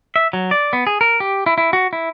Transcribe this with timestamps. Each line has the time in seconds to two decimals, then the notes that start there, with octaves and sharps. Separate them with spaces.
0.16 E5
0.33 F#3
0.51 D5
0.73 B3
0.87 G#4
1.01 A#4
1.20 G4
1.46 E4
1.58 E4
1.73 F#4
1.93 E4